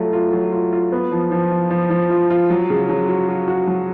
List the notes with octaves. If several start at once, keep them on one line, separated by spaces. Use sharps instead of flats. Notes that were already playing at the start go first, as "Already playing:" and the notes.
Already playing: F#3 A3 F4
F4
F#3
F4
F4
B3
F3
F3
F4
F3
F3
F4
F4
F#3
C#3
F#3
F#4
F#4
F#4
F#3